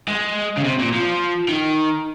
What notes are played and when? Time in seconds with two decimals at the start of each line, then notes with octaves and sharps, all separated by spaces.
0.08 G#3
0.58 C#3
0.64 C3
0.79 A#2
0.93 F3
1.49 D#3